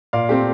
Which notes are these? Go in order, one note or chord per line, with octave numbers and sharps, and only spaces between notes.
A#2 D5 F5
A3 C4 G4